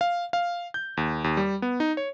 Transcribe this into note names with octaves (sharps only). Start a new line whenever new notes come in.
F5
F5
G6
D#2
D#2
G3
B3
D#4
C#5